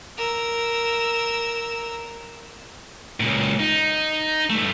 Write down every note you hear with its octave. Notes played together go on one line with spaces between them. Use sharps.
A#4 E6
C#2 A#2
D#4
G2 A3